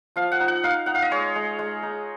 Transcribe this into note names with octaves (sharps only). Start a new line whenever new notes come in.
F3 F5
F#5
D#4
F#5
D#4 F5
D#4 F#5
F5
D#5
G#3 C#5
G#3
G#3
D#4